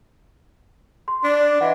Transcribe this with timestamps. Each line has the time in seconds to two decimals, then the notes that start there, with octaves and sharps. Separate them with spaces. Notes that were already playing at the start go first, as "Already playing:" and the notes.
1.08 C6
1.24 D4
1.61 E3 D#5 F#5